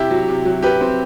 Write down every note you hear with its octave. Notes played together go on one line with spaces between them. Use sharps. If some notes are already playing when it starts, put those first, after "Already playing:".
Already playing: C3 E4 G4
F#3
C3
F#3
F#3 G4 B4
C4